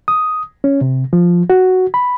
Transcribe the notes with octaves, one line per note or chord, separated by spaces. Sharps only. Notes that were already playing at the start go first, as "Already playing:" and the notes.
D#6
C#4
C3
F3
F#4
B5